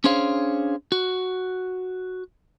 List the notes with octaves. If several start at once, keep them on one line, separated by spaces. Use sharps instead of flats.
C#4 D4 G#4 C5 C#5 F5
F#4